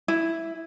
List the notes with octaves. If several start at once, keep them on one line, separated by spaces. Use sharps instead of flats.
E4